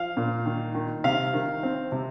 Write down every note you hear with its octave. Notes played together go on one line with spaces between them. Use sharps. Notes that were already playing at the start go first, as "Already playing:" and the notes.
Already playing: F3 F5
A#2
D#3
D#3
C3 F5
D#3
C4
C3